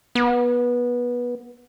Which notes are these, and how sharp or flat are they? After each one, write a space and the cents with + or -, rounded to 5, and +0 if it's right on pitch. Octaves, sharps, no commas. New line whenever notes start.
B3 -20